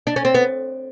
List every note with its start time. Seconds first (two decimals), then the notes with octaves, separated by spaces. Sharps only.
0.07 D4
0.16 C#4
0.25 C4
0.34 B3